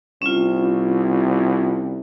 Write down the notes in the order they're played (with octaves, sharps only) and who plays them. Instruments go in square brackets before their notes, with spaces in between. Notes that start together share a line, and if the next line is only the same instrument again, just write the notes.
[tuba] C2 [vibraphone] C#4 F4